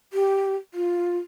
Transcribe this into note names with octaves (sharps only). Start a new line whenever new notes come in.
G4
F4